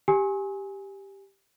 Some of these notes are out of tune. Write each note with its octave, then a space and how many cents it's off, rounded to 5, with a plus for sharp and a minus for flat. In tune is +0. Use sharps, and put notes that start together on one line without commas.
G4 +0 G#5 +0 E6 -45